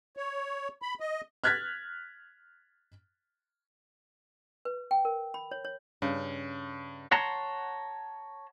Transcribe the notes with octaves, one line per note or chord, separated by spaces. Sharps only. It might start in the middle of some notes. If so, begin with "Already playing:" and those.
C#5
B5
D#5
F6 F#6 G#6 A6 B6
B4
G5
A#4
B5
C#5
C#5
G2 C#3
C#5 F#5 A5 A#5 C6